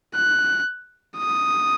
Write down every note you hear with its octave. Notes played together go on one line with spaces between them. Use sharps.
F#6
D#6